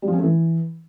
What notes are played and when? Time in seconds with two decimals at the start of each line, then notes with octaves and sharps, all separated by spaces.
0.02 G3
0.07 F3
0.13 C#4
0.18 A3
0.23 E3